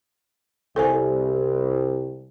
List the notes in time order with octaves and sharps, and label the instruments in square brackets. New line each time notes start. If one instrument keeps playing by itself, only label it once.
[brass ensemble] C2 [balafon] A4 C5 G#5